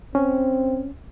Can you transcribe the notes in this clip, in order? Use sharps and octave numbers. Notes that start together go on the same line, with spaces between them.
C4 C#4